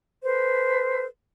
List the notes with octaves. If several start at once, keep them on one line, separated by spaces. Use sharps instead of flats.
A4 B4 C5